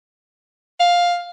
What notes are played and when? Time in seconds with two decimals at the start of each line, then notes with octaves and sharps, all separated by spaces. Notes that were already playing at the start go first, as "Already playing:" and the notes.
0.80 F5